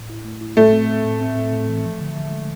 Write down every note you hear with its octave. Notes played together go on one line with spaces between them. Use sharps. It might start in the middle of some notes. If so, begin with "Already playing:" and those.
Already playing: A2
E4
A3
E4
A2 A3
C4
C4
A2
C4
A2
A2
E3
F3
D3
D3
G#3